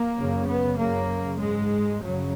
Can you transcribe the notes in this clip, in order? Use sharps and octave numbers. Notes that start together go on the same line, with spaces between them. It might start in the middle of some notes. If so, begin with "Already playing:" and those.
Already playing: A#3
F#2 C#3
B3
F#2 C#3 A#3
G#2 G#3
F#2 C#3 F#3